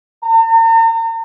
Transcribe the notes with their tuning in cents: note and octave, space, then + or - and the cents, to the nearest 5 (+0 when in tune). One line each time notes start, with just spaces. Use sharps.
A#5 -45